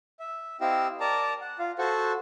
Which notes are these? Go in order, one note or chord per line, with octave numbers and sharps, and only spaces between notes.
E5
C4 E4 G4 D#5 F5 E6
A#4 D5 A5 A#5
F#5
F4 F5
F#4 A4 C5 F#5 C#6